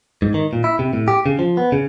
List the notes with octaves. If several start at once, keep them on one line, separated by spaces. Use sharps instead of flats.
G#2
D#3
A#2
E4
C3
A2
G4
C#3
F3
B3
C#3